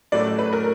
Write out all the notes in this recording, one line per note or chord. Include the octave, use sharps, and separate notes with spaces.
A2 F#3 A3 C#4 F#4 D5
B4
A#4